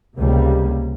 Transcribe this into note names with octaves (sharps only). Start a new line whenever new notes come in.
C#2 C3 G3 A#3